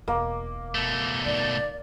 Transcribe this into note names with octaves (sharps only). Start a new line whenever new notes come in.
E1 A#3
B2 A3
D#3 D5